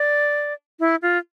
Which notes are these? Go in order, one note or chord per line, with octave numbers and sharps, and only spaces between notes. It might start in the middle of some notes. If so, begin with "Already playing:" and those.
Already playing: D5
E4
F4